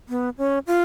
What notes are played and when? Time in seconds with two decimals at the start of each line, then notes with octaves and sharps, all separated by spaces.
0.09 B3
0.38 C#4
0.67 F4